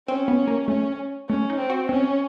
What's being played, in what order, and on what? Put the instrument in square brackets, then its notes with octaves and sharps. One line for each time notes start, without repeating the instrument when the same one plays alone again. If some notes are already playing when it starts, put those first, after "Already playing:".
[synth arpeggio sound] C4 [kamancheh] C#4
[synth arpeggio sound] B3
A#3
[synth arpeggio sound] A3 [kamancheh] C#4
[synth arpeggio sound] A3 [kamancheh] C#4
[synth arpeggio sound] D#4
[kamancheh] C4
[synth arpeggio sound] F#4
[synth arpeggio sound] C4 [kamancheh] C#4